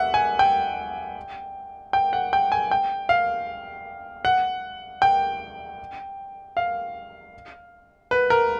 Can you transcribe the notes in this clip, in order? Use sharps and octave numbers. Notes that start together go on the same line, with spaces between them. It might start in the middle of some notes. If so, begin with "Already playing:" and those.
Already playing: E5 F#5
G#5
G5
G5
F#5
G5
G#5
G5
F5
F#5
G5
F5
B4
A#4